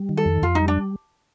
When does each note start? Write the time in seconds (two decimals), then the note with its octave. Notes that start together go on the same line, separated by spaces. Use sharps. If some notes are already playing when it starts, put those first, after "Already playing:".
Already playing: G3
0.09 D#3
0.17 A4
0.25 F2
0.42 F2 F4
0.55 G3 D#4
0.68 D4